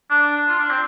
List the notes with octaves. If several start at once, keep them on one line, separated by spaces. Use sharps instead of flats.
D4
F4
D4
C4